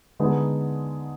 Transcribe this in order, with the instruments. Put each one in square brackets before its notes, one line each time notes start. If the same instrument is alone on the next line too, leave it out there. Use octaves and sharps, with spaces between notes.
[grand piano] D3 G#3 B3 D#4